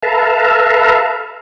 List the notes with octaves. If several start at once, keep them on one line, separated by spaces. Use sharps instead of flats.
A4 B4 E5 F5 A5 A#5